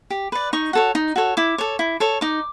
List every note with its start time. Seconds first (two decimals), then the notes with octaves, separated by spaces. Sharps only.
0.10 G4
0.32 B4 D5
0.53 D#4 C#6
0.73 F#4 A4 C#5
0.95 D#4
1.16 F#4 A4 C#5
1.37 E4 D6
1.58 A4 C#5
1.79 E4
2.00 A4 C#5
2.21 D#4 D6